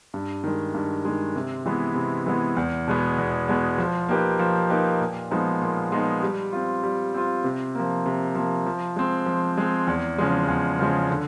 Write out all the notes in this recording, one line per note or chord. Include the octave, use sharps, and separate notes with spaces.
G2
D#3 G#3
G2
D#3 G#3
C3
E3 G#3 B3
C3
E3 G#3 B3
E2
B2 G#3 B3
E2
B2 G#3 B3
F3
A#3 D#4 G4 B4
F3
A#3 D#4 G4 B4
A#2
F3 G#3 B3 D#4
A#2
F3 G#3 B3 D#4
G3
C4 F4
G3
C4 F4
C3
F3 A#3
C3
F3 A#3
F3
G#3 C4
F3
G#3 C4
E2
C#3 F3 G#3
E2
C#3 F3 G#3
D3